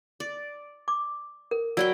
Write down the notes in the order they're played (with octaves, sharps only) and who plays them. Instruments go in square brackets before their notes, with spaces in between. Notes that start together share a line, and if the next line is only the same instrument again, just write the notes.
[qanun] D5
[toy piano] D6
A#4
[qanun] F#3 B4 G5 [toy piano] D5 E6